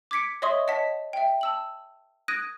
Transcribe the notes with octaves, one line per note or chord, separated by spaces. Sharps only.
D6 G#6 B6 C#7 D7
C#5 D#5 E5 C6 C#6 D#6
C#5 D#5 F#5 A5 B6
E5 G5
A5 E6 F#7
D#6 F#6 G#6 A#6 D7 D#7